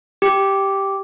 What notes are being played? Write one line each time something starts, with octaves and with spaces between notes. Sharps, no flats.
G4